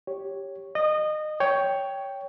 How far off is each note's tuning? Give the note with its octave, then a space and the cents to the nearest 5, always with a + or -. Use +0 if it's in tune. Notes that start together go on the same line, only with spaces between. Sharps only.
G4 +0 C#5 +0
D#5 -25 D#6 +0
C#5 +10 G5 +0